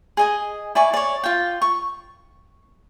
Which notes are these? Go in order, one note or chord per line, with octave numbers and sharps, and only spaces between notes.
G#4 D#5 G#5
E4 D5 G#5 C#6
C#5 D5
F4 G5
C#6